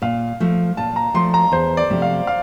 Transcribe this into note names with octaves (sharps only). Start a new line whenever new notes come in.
A#2 F5
F3 A3
A#2 A5
A#5
F3 A3 C6
A#5
E2 C5
D5
C3 F3 A3
F5
F5